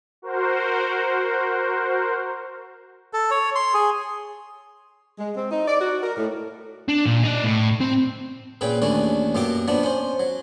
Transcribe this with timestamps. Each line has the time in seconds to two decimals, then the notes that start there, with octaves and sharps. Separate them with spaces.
0.22 F#4 A#4 C5
3.13 A4
3.31 C#5
3.55 C6
3.74 G#4
5.19 G#3
5.36 C4
5.51 D#4
5.68 D5
5.81 F#4
6.03 A#4
6.17 A2
6.88 D4
7.06 A#2
7.23 D#4 D5
7.44 A2
7.81 C4
8.61 A#2 C#3 B4 G5
8.82 D#2 E3 A3 C#4 D4
9.35 F#2 B2 A#3 G4 D6
9.68 F3 B3 D4
9.83 C#4 C5
10.20 F#3